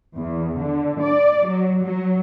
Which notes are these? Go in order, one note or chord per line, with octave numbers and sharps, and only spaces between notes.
E2
D3
D5
F#3
F#3